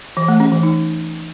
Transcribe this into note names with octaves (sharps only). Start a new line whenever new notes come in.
E3
A3
C#4
E3
D#4